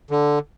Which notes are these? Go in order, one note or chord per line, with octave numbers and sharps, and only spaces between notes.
D3